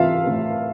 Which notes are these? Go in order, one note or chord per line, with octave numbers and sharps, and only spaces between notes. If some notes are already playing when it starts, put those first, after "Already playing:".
Already playing: E3 F4 E5 F5
A2